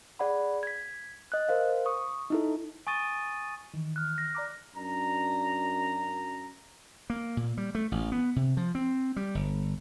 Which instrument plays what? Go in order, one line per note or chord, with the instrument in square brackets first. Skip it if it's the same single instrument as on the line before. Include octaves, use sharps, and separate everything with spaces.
[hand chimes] G#4 D5 F#5 B5
G#6 B6
D#5 F#6
A#4 C5 F5
C#6 D#6
D#4 E4 A4
[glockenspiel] G#5 C#6 D#6 A6 D#7
[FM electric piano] D#3 E3
[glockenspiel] F6 F#6
A#6
[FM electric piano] D5 A#5 D6
[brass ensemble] F#2 D4 A#5
[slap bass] A#3
A#2
G3
A3
A1
B3
C3
F3
C4
G3
G1